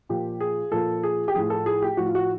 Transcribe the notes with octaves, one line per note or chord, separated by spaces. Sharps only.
A#2 F3 G4
G#4
A#2 F3 A4
G#4
G4
A2 F3 G#4
A4
G#4
G4
A2 F3 F#4
F4
F#4